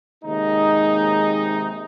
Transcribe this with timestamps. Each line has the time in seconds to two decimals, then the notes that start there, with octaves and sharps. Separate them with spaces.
0.24 D#2 C3 G#3 D#4